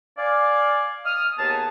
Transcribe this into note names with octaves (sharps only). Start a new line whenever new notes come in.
D5 F5 G#5
D#6 F6
D#2 B3 G#4 A5